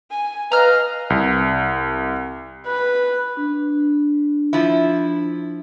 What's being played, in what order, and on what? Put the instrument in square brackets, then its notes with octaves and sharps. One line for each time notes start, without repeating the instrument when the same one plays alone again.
[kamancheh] G#5
[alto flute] B4 [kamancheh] D#5 F5 [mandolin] A#5 F6
[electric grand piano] C2
[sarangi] B4
[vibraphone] D4
[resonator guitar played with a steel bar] F3 E4